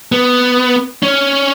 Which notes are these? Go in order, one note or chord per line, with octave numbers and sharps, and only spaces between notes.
B3
C#4